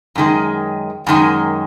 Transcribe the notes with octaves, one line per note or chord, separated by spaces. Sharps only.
F#2 D#3 G#3
F#2 D#3 G#3